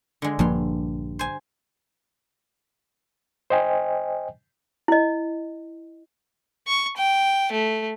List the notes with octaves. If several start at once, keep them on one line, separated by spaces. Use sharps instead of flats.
D3 G#3
A#1 G2 F3 A#3 C6
C5 G#5
C5 D#5 G5 G#5
E4 D#5
C#6
G5
A3